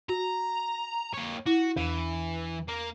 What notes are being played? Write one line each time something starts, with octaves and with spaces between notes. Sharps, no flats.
F#4 A#5
A#3 C#5
E4 F#4
E2 E3
A#3